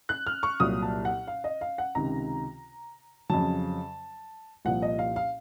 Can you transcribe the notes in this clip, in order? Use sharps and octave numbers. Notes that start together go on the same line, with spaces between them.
F#6
F6
C#6
C2 A#2 F#3 D#6
A5
F#5
F5
D#5
F5
F#5
C#2 C3 D#3 A#5
F2 C#3 F#3 A5
C2 A#2 F3 F#5
D#5
F5
F5